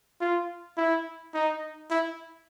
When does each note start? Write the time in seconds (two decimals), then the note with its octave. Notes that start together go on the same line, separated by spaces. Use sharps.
0.21 F4
0.78 E4
1.35 D#4
1.91 E4